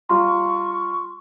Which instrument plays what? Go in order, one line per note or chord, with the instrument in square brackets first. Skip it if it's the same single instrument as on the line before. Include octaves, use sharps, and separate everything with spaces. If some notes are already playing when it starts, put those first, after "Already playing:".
[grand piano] G3 F4 A#5 [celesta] C6 [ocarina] C#6